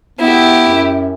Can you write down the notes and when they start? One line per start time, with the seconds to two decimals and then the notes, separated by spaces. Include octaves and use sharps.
0.19 B3 E4 G4
0.68 F#2